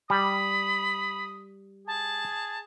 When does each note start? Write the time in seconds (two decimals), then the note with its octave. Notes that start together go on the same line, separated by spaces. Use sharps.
0.10 G3 B5 D#6
1.87 G#4 A5